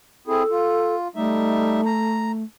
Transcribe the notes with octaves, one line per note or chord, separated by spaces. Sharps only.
C4 E4 G#4 A4
F4
G3 A3 D#4 E5
A#5